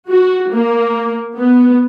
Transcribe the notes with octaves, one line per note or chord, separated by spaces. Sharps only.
F#4
A#3
B3